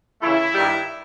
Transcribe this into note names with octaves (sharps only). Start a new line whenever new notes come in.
C#3 E3 A3 E4
G2 D#3 G3